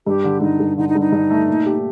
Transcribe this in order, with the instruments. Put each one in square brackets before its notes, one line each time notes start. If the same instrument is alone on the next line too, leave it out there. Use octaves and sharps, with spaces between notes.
[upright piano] G2 [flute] G4
[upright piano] D3
[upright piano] G2 [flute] D#4
[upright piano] G2
[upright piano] D3 [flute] D#4
[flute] D#4
[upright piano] G2
[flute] D#4
[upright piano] G2
A3
A#2
G4